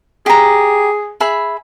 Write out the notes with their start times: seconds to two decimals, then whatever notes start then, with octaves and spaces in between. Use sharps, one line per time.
0.26 G4 G#4 A#5
1.20 G#4 E5 B5